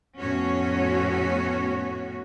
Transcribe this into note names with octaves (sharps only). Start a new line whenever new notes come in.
F2 A2 B3 C#4 F#4 C#5